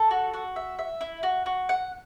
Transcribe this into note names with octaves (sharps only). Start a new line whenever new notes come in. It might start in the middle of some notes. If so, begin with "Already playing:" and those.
Already playing: A4
F#4
F#4
E5
E5
E4
F#4
F#4
F#5